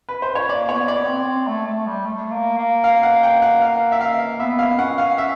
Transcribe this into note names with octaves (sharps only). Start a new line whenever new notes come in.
B4
C5
C#5
A#3 D5
B3 C#5
B3 D5
B3
C4
C4
A3
A3
G3
A3
A#3
A#3
F5
F#5
G5
F#5
F5
E5
F5
B3 E5
F5
C#4 F#5
F5
E5